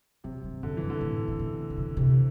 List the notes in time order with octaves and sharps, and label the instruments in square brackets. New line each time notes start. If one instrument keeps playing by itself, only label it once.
[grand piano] C3 [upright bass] F#3
[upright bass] G2
[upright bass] F#2 [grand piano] D3
[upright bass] G2 [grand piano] E3
[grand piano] D3
[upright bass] A2
A2
B2
C3
B2
C3